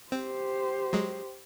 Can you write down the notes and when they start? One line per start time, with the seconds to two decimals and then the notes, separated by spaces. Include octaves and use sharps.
0.12 C4 G4 C5
0.93 F#3 G#3